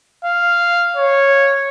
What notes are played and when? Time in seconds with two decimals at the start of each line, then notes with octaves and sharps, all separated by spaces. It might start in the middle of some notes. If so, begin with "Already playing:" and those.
0.25 F5
0.96 C#5